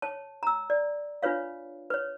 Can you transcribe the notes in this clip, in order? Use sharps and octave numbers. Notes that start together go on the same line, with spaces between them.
C#5 A5
A#5 E6
D5
D4 F4 B4 C#5 F5
B4 C#5